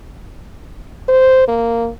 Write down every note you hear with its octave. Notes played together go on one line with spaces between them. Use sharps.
C5
A#3